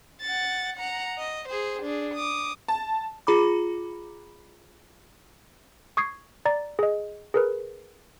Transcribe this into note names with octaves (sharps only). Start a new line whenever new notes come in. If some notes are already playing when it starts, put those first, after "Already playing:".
F#5 A6
F#5 A#5
D#5
G#4 C5
D4 G#4
D6 D#6
A5
F4 G#4 A#5 B5 D6
C#6 D#6 G#6 C7
D5 A#5 A6
G#4 D#5
G#4 A#4 B4